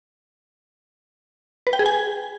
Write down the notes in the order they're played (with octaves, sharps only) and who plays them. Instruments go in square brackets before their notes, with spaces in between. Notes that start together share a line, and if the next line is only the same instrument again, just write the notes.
[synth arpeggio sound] B4
G5
G#4
G#5